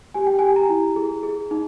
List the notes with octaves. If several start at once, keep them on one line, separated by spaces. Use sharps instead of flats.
G4 G#5
G5
G4 G#5
A#5
E4
G#4
G#4
D#4